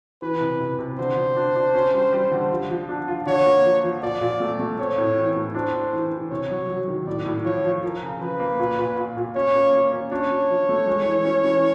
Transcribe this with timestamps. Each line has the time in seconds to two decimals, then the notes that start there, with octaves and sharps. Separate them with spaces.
0.22 E3 B4
0.41 C3
0.60 C3
0.79 C3
0.98 D3 C5
1.17 D3
1.36 D4
1.55 D4
1.74 C#4
1.93 G3
2.13 G3
2.31 D3
2.51 F3
2.70 F3
2.89 D4
3.08 F4
3.27 D3 C#5
3.46 A#3
3.65 F3
3.84 F3
4.03 A#2 D5
4.21 A#2
4.40 A3
4.59 A3
4.79 C4 C#5
4.98 A2
5.17 E3
5.36 A2
5.55 D4 C5
5.74 D4
5.93 E3
6.12 E3
6.30 C3 C#5
6.50 F#3
6.69 F#3
6.88 D#3
7.07 A2 D5
7.26 A2
7.45 F3 C#5
7.65 F3
7.82 F3 A#4
8.03 C#3
8.21 F3 B4
8.40 A#3
8.59 A#2
8.79 A#2
8.97 A#2
9.17 A#2
9.35 C#4 C#5
9.54 A#3
9.73 A#3
9.92 C#4
10.11 D4 C#5
10.31 D4
10.50 F3
10.69 A3
10.87 G#3
11.06 E3
11.25 C#4
11.44 E3